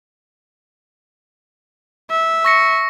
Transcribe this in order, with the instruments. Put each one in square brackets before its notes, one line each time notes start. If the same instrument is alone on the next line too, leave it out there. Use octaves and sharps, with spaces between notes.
[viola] E5
[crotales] C#6 A#6 C#7